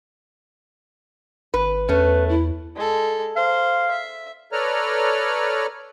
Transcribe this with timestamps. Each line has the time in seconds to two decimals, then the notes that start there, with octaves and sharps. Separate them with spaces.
1.54 G#1 B4
1.89 E2 A3 C#4 B4
2.29 E4
2.76 G#3 A4
3.36 C5 F5
3.91 E5
4.52 A4 B4 C#5 D5 A#5 F6